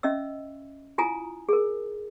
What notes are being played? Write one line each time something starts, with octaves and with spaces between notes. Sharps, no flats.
C#4 D#5 E5 E6
E4 F4 G#5 A#5 D#6
G#4 A#4